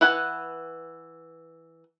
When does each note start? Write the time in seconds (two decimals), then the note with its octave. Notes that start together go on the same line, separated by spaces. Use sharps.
0.01 E3 B4 F#5 G#5